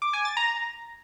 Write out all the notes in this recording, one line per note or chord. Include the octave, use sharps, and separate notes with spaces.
D6
G#5
A6
A#5